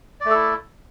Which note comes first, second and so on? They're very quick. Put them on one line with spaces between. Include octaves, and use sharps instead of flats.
D5 A3 A4 E4